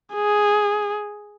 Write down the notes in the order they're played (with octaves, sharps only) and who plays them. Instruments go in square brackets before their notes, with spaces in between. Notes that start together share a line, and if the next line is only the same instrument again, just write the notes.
[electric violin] G#4